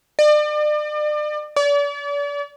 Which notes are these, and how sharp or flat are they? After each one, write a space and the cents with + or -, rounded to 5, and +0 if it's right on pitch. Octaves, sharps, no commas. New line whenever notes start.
D5 +40
D5 -40